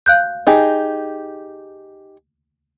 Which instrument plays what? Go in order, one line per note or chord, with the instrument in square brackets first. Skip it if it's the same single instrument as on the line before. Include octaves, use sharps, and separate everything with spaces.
[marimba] F5 F#6 G6
[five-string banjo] D#4 G4 G#4